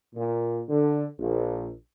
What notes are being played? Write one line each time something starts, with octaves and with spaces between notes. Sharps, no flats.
A#2
D3
A#1